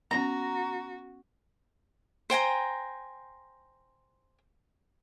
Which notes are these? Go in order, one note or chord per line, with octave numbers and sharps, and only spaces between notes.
B3 C#4 F#4 A#5
C5 G5 G#5 A#5